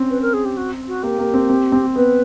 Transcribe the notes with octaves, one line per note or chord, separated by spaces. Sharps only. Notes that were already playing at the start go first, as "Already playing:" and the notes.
Already playing: C4 C#4
B4
A#4
G#4
G4
F#4
F#4
A#3 G4
A#3
C4
C4
C4
B3 B4